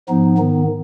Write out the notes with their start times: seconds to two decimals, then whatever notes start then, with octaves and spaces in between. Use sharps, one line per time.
0.09 G#2 F3 B3 D#4
0.38 G#2 D#3 B3